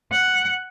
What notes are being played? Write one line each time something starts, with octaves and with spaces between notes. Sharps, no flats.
F#5